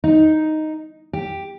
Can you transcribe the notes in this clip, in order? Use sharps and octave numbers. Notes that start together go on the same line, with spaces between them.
D#4
G4